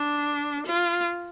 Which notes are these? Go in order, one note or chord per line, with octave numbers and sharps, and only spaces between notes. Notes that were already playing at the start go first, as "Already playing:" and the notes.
Already playing: D4
F4